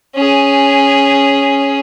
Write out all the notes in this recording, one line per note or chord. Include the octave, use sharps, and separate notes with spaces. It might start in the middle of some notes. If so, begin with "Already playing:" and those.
C#4 G#4